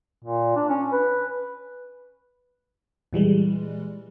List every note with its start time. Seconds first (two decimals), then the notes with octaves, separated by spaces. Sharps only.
0.24 A#2
0.56 D4
0.69 C#4
0.92 B4
3.13 A#2 E3 G3 G#3